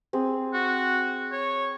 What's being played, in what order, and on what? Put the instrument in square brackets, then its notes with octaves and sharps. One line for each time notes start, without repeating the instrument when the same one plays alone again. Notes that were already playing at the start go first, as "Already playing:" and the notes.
[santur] C4 G#4
[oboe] F#4
C#5